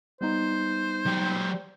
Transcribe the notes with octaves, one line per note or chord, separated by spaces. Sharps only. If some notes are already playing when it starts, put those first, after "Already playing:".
G3 B3 D#4 C5
F#3 G4